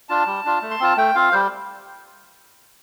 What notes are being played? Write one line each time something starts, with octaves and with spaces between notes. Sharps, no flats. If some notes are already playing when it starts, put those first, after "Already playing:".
D4 F4 A5
G3
D4 F4
A3
C6
C4 F4 A5
A3 G5
C4 F4 F5
G3 C5